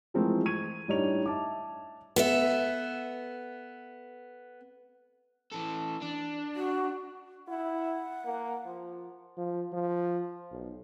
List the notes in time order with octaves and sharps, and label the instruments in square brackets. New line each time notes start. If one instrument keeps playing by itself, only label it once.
[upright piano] E3 F3 G#3 A3 C4 A#4
C#6 G#6 D#7
A2 G3 D4 D#4 C#5 F7
E5 A5 D6
[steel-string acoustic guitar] B3 A4 E5
[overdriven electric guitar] E3 A4
D4
[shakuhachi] F#4
[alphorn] E4 [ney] F#5
[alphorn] A#3
F3
[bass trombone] F3
F3
B1